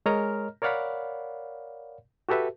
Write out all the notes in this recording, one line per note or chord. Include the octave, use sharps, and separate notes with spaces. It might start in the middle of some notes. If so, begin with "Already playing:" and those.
G#3 A#4 C#5 D#5 A#5 F6
A#4 C#5 D5 F5 F#5 B5
F#4 G4 A4 B4 E5